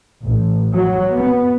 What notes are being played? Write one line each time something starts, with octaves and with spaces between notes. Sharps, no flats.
A1
F#3
B3